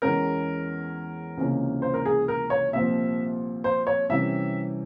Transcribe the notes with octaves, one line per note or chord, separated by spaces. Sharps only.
E2 E3 G#3 C#4 A#4
C#2 C3 E3 A#3 C#4
C5
A#4
G#4
A#4
C#5
C2 A#2 F3 E5
C5
C#5
C3 E3 G3 C#4 E5